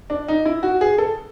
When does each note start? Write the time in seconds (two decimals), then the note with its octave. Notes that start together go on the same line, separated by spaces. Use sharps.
0.10 D4
0.28 D#4
0.45 E4
0.63 F#4
0.81 G#4
0.98 A4